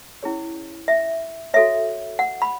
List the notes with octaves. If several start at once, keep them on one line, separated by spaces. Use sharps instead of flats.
C#4 E4 G#4 C#5
E5
F#4 A4 C#5 E5
F#5
B5